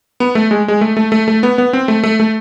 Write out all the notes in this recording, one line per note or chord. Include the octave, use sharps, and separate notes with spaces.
B3
A3
G#3
G#3
A3
A3
A3
A3
B3
B3
C4
A3
A3
A3